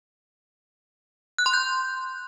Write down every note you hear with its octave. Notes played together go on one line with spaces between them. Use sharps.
F#6
C6
G6